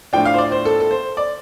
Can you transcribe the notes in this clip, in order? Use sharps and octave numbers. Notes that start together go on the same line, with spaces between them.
A2 F3 D4 G5
F5
C5
D5
C5
A4
A4
C5
D5